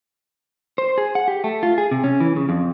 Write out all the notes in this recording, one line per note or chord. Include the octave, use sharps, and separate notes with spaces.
C5
G#4
F#5
G4
A3
F4
G#4
C3
C#4
E3
C#3
F2